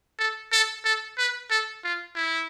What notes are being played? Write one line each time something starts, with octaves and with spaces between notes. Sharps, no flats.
A4
A4
A4
B4
A4
F4
E4